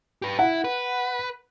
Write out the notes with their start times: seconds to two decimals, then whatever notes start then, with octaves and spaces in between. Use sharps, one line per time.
0.22 G4 B4
0.39 E4 F#5
0.64 B4